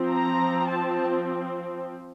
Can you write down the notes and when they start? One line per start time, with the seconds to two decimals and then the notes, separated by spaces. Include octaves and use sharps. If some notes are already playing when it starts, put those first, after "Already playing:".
Already playing: F3 C4
0.11 A#5
0.69 A5